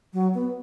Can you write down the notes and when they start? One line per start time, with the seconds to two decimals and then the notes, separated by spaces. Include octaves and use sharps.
0.13 F#3
0.34 B3